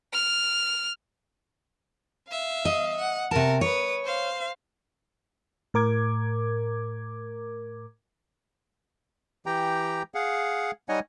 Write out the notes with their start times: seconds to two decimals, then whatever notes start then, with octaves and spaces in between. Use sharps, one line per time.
0.14 F6
2.28 E5 F5
2.65 D#5
2.97 F#5
3.31 C3 A#4 A5 C#6
3.61 B4 C#5 D#6
4.04 C5 F5
5.74 A2 A#4 D6 G#6
9.46 E3 G4 G5 A#5
10.14 G#4 F5 F#5
10.89 G3 D#4 C#5 D#5 F#5 G#5